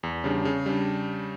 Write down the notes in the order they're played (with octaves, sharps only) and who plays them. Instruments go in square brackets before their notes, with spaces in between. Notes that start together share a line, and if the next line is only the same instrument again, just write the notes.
[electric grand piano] E2
C#3 G3 D4
C#3
G3 D4